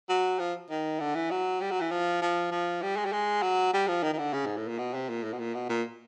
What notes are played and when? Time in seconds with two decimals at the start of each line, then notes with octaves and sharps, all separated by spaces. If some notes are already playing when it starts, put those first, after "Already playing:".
0.09 F#3
0.39 F3
0.70 D#3
1.00 D3
1.15 E3
1.31 F#3
1.61 G3
1.71 F#3
1.81 E3
1.91 F3
2.22 F3
2.51 F3
2.82 G3
2.97 G#3
3.05 G3
3.12 G#3
3.43 F#3
3.73 G3
3.88 F3
4.03 D#3
4.13 D#3
4.18 D3
4.33 C#3
4.46 G#2
4.57 A2
4.68 A#2
4.78 B2
4.94 C3
5.09 A#2
5.24 A2
5.33 B2
5.39 A#2
5.54 B2
5.69 A#2